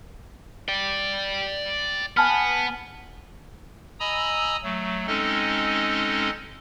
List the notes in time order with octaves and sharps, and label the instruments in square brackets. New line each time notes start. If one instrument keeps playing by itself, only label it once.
[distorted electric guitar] D5 G5
[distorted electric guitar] B3 [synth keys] G#5 A5 F6
[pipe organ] D#5 G#5 A#5 B5 D#6 E6
F#3 A3
G#3 C4 C#4 D#4 A4 D#5